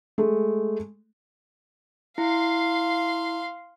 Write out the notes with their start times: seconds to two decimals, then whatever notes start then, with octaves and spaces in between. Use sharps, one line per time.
0.18 G#3 A3
2.18 E4 F5 C6